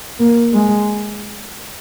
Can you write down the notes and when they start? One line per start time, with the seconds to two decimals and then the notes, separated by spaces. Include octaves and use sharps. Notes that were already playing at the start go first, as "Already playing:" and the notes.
0.19 A#3
0.53 G#3